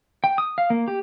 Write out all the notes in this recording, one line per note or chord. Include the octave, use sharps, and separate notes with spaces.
G5
D#6
F5
A#3
G4